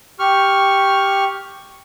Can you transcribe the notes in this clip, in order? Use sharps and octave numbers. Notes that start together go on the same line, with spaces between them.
G4 C#6 F6